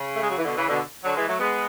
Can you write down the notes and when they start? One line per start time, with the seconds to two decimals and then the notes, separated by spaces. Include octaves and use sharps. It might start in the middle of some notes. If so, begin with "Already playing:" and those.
Already playing: C#3
0.16 A3
0.23 G#3
0.31 F#3
0.38 E3
0.45 B2 D3
0.57 C#3 E3
0.69 B2 D3
1.04 D3 F#3
1.16 E3 G#3
1.28 F#3 A3
1.40 G#3 B3